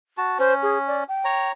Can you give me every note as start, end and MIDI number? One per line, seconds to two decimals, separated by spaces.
0.18 0.38 66
0.18 0.38 81
0.39 1.04 61
0.39 0.54 72
0.63 0.78 68
0.87 1.03 74
1.08 1.49 79
1.25 1.52 73
1.25 1.52 82